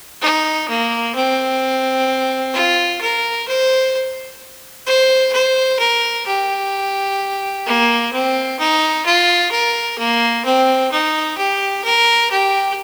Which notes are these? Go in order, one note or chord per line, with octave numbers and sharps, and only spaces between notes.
D#4
A#3
C4
F4
A#4
C5
C5
C5
A#4
G4
A#3
C4
D#4
F4
A#4
A#3
C4
D#4
G4
A#4
G4